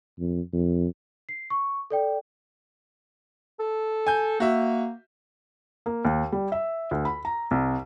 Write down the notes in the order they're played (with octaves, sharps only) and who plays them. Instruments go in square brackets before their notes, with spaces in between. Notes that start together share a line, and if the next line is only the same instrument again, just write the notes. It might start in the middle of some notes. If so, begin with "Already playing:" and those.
[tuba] F2
F2
[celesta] C7
C#6
A4 D5 G5
[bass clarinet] A4
[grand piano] G#5 G6
[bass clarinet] A#3 [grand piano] F#4 E5
[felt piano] A#3
D#2
G3
E5
D2
B5
A#5
C2